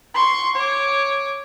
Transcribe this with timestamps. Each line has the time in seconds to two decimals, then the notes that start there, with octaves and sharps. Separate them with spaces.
0.14 C6 C#6
0.55 C#5 D6